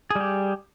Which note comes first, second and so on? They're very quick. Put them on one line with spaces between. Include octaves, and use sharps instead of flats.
G#4 G3 G4